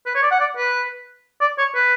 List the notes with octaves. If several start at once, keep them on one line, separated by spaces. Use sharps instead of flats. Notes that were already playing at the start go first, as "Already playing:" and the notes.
B4
C#5
D5
F#5
D5
B4
D5
C#5
B4